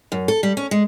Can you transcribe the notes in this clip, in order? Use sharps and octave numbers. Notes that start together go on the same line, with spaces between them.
F#2
A4
G3
C#4
G#3